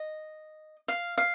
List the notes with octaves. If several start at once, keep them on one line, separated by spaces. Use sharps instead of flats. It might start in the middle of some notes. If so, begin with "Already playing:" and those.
Already playing: D#5
F5
F5